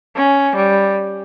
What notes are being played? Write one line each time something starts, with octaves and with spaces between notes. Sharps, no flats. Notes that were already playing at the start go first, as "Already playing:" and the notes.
C#4
G3